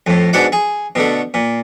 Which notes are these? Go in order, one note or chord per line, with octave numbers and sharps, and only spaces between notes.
F2 A2
G#2 B2 D4 F#4 F#5 D6
G#4
B2 D3 A3
A#2